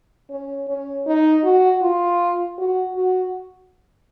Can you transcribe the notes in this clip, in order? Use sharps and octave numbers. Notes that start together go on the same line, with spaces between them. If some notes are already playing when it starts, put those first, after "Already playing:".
C#4
C#4
D#4
F#4
F4
F#4
F#4